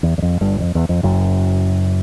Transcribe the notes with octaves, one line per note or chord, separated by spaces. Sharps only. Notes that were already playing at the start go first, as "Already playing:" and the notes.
E2
E2
F2
G1 G2
F2
E2
F2
F#1 F#2